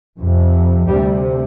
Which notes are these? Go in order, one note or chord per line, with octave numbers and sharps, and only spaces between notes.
F2 C3
D2 C3 G3